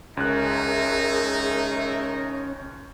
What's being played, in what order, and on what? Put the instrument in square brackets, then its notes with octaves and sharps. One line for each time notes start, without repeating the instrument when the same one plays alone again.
[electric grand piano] C#2 F#6 [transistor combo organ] C#4 [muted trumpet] D#4 [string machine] G#4 A#4 E5